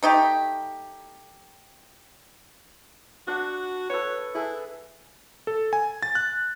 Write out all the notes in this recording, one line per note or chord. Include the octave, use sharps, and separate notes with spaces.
A3 D#4 G4
D4 F#4 F#5
A4 B4 C#5
E4 G#4 A4
A4
G#5
A6
F#6